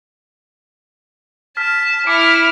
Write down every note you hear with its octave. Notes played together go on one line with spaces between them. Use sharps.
A5 F6 B6
E4 D6 F6 C#7 D7